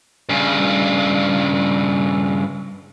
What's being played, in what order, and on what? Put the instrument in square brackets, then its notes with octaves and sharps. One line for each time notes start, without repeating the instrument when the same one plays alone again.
[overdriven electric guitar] G2 C#3